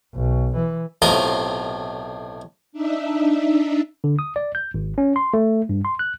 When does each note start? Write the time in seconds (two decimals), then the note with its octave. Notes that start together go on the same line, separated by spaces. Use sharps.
0.15 B1
0.56 E3
1.02 B1 A2 C3 F4 A#4 D#5
2.72 D4 D#4 E5
4.04 D3
4.19 D#6
4.36 D5
4.55 G6
4.74 G#1
4.98 C#4
5.16 C6
5.34 A3
5.69 G2
5.85 C6
5.99 F#6